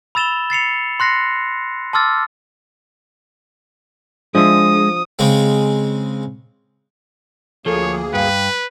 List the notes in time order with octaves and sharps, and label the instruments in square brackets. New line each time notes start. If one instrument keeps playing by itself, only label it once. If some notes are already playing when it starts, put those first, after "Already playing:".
[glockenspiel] B5 E6 A6 E7 F7 G7
A6 C7 C#7 F7
C6 F#6 A#6 C7 C#7
A5 C6 D6 E6 F6 A6
[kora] F3 E5 [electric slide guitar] G#3 [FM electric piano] D4 G#4 [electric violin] D#6
[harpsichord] C#3 G#3 C4
[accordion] D2 A#3 G#4 [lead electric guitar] F3 [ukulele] A4 [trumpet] C#5
[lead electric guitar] G2 [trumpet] B4 [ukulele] F5 G5